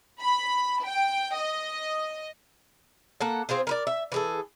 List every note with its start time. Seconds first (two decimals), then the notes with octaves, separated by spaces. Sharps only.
0.21 B5
0.87 G5
1.36 D#5
3.21 A#3 A4 F#5
3.49 C4 F4 G#4 C5
3.67 A#4 B4 D5
3.87 E5
4.12 E3 G#4 A4